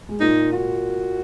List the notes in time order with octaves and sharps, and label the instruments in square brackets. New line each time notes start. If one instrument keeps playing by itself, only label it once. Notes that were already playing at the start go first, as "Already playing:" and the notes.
[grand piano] G#3
[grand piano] A#2 A#3 [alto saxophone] D#4
[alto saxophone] F#4